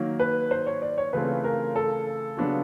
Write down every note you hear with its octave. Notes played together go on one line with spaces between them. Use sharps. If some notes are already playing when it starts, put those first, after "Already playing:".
Already playing: D#3 F#3 A#3
B4
C5
C#5
D5
C#5
C#3 E3 A3 C4 F4 B4
A#4
A4
C#3 F#3 B3 D4 F4